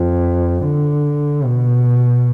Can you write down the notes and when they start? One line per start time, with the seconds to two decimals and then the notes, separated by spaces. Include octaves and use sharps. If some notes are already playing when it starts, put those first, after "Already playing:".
Already playing: F2
0.65 D3
1.45 B2